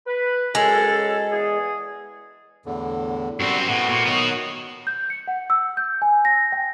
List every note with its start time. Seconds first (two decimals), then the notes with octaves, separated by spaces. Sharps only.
0.07 B4
0.55 F#2 G#3 A4
1.31 E2 G#4
2.66 E2 A2 D3
3.40 F#2 G3 C4 F#4
3.68 A2 A3 B3 F#4
3.89 A#2
4.05 D#3 F#3 B3 F#4 D#6
4.87 G6
5.10 C#7
5.28 F#5
5.50 E6
5.77 G6
6.02 G#5
6.25 A#6
6.52 G5